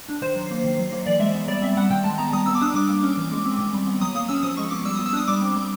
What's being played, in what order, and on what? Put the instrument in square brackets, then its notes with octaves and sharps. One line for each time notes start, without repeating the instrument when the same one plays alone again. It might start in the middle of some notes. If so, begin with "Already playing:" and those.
[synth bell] D4
D#3 C5
F#3
A#3
D#3
F#3
A#3
E3 D5
G#3 E5
B3
G3 D5
C4 E5
G3 F#5
D#3 G5
G#3 A5
B3 A#5
G3 D#6
B3 E6
D6
D4 D#6
G3 D6
A#3
C#4
E3
G#3
C4
D#3
G3
B3
F#3 D#6
A#3 D#6
C#4 E6
F3 D#6
G#3 C#6
B3 D6
G3 E6
D#6
B3
E6
D4 D#6
G3 D6
C4
G3